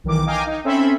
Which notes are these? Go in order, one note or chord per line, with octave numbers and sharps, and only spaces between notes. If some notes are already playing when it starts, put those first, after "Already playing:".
B1 D#3 E3 D6
D#5 F5 G5 G#5 A#5 D6
D#4
C4 C#4 A4 E5 B5 C6